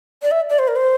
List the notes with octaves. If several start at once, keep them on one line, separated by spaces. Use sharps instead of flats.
D5
E5
D5
C5
A#4
C5